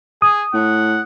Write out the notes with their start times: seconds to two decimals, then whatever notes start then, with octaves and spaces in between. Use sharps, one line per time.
0.22 G#4 D#6
0.54 A2 F#5